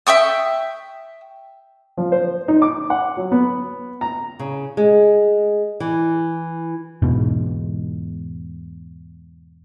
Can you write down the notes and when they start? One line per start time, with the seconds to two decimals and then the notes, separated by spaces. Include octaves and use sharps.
0.07 E5 G5 C#6 D#6
1.97 F3
2.12 C5
2.48 D#4
2.62 D6
2.90 F#5
3.17 F#3
3.32 B3
4.01 A#5
4.39 C#3
4.77 G#3
5.80 E3
7.02 E2 G#2 B2